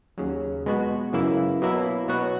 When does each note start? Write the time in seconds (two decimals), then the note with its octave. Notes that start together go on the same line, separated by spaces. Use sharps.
0.17 D#2 C#3 F#3
0.66 B2 G#3 B3 F#4
1.13 F#2 C#3 E3 A#3 E4
1.62 B2 F#3 A#3 E4
2.08 B2 F#3 B3 F#4